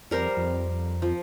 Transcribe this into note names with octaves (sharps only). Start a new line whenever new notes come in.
F2 G3 A#4 C5
F2
F3